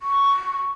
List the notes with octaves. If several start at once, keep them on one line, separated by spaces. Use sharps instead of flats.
C#6